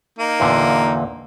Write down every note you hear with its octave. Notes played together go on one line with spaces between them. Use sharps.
A#3 D#4
E2 A#2 D3